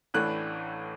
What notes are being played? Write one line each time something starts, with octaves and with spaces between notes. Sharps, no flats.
A1 A2 E3 A3 D4 F#6